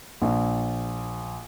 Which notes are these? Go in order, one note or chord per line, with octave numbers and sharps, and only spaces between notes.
A#1